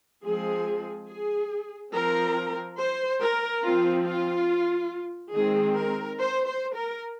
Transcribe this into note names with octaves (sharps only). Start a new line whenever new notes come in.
F3 G#3 C4 G#4
G#4
F3 C4 A#4
C5
A#4
F3 C4 F4
F4
D#3 G#3 C4 G#4
A#4
C5
C5
A#4